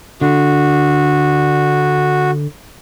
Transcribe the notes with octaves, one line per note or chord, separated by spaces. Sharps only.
D3 F#4